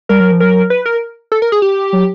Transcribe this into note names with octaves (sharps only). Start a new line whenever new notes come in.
G3 A#4
F#3
F3
F#3 A#4
B4
A#4
A4
A#4
G#4
G4
F#3